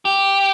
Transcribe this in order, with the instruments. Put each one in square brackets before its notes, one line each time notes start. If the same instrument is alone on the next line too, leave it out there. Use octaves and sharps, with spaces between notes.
[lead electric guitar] G4